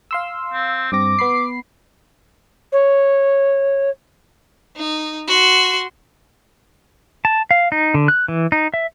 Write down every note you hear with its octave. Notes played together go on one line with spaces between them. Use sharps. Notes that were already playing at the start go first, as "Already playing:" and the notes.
F5 C6 E6
C4
G2 C4 D6 A#6
B3 B5 C7
C#5
D#4
F#4 C6
A5
F5
D#4
D3
F#6
E3
D#4
E5